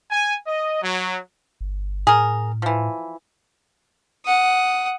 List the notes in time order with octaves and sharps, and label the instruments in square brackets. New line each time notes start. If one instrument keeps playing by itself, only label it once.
[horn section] G#5
D#5
F#3
[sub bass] G1
[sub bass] A2 [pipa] G#4 A#4
[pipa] E3 F3
[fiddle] F#5 D#6